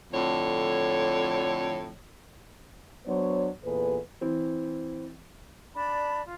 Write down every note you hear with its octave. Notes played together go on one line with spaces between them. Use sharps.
F2 A2 D3 C#5
F#3 B3 D4 C5 C#5
E2 A#2 G#4 A4 B4
E3 C4
D4 D5 A5 B5
F4